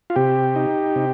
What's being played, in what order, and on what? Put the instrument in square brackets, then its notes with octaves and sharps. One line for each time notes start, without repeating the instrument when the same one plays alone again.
[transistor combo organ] F4
C3 G4
D#4
C3